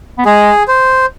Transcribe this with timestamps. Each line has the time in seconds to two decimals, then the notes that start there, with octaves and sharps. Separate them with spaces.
0.18 B3
0.25 G#3 G#4
0.68 C5